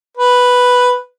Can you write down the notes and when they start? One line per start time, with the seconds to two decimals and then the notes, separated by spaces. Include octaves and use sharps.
0.17 B4